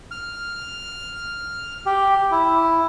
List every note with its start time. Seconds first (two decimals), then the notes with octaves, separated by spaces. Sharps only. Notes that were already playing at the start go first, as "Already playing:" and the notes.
0.11 F6
1.86 G4
2.32 E4